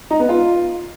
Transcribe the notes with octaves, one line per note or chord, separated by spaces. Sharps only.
D#4
B3
F4